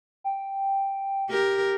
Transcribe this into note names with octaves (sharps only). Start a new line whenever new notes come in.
G5
G4 A#4